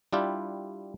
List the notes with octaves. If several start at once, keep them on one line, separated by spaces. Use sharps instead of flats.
G3 D4 E4 F4 G4